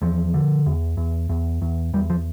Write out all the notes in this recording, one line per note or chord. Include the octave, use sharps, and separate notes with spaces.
E2 F3
D3
E2
E2
E2
E2
E2 G3
F3